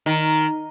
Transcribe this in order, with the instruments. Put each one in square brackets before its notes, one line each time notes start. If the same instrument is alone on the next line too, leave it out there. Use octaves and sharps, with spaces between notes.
[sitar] D#3